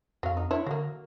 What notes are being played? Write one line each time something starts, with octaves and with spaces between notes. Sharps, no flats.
F2 F#3 F5
D#4
D4 E4 C#5
D3 F#3 A#3